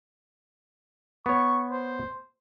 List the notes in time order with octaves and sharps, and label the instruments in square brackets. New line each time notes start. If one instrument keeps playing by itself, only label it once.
[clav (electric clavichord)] B3 C#5 [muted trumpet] C#6
[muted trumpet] C5